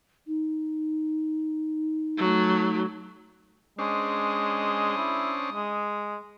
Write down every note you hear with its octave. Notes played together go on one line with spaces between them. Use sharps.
D#4
F#3 A3
G#3 C#4 D4 C5 D#6
E4
G#3